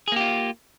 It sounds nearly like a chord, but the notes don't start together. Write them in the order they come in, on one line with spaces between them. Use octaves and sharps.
G#4 A#3 G4 F4